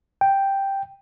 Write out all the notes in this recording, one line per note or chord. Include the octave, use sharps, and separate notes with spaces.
G5